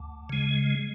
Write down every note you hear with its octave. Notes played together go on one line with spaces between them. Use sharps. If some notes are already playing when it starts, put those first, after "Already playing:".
Already playing: D2
C#3 G#3